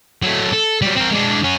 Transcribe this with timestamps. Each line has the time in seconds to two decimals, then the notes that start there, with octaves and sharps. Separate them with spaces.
0.23 F#3 A3
0.53 A4
0.82 F#3 G3
0.96 C4 A#4
1.11 G#3 D4
1.43 C#4 F#4